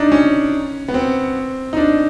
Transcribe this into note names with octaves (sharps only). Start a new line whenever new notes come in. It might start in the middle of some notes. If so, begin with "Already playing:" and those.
Already playing: D4 D#4
C#4
B3
C4
D#4
D4